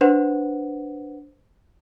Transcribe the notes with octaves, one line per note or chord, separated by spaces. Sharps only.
D4 B4 C5 F#5